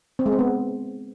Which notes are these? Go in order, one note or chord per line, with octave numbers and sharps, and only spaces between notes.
C4
G#3
C4
B3